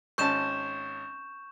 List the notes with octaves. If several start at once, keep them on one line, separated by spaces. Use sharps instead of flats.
G#1 C#4 A5 C#6 G6 E7